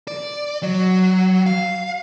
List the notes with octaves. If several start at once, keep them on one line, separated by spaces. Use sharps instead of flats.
D5
F#3
F5